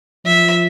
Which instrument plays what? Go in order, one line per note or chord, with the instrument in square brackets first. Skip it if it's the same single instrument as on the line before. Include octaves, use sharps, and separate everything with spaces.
[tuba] F3 [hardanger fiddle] E5